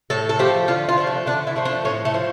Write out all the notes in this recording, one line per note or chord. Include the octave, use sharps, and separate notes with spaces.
A2 A4
A4
F3 A3 G4
D3 F4
F4
F3 A3
D4
D3 D4
E4
F3 A3
D4
A2 C#4
A3
F3